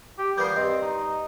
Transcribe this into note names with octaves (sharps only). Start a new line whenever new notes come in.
G4
F3 G3 A#3 B3 G6 C7
G2 C4 D#5
D#4